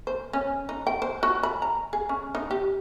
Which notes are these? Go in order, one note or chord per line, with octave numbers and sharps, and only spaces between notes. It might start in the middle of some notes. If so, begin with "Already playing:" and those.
C5
C#4
D#4
G5
C5
F#4
B5
A#5
G#4
C#4
D#4
G4